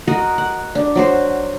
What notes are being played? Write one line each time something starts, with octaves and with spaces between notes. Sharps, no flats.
F#4 A#4 D#5 F#5
F#5
D4
F#3 F#4 C5